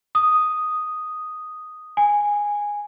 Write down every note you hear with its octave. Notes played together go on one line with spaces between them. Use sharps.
D#6
G#5